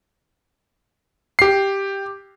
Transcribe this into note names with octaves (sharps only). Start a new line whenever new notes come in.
G4 C7